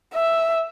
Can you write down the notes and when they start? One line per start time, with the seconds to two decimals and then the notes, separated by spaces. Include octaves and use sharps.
0.14 E5